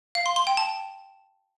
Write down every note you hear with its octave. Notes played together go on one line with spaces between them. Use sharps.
F5
C6
C6
G5
A5